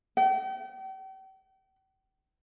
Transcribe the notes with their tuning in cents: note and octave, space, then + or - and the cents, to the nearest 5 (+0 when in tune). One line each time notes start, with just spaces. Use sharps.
G5 -40